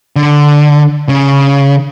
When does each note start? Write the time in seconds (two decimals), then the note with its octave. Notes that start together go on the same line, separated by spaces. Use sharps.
0.16 D3
1.09 C#3